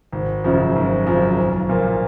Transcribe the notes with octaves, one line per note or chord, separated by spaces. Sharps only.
G#1
F#2 C#3 F3
G#1
F#2 C#3 F3
B1
A#2 F3 A#3